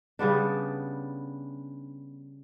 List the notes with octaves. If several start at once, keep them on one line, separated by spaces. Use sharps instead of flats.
C#3 G3 B3 D4